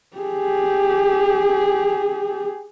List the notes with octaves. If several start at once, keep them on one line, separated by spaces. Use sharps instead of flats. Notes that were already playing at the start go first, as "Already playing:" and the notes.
G4 G#4